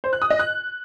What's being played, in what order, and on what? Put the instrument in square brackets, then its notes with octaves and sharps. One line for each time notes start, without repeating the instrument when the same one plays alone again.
[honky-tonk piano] C5
F#6
D#6
D#5
F#6